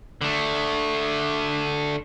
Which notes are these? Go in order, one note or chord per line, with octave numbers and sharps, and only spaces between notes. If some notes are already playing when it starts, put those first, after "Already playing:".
D3 A3